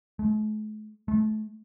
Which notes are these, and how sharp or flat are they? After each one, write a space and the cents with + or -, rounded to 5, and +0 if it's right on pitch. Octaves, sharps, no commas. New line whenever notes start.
A3 -45
A3 -30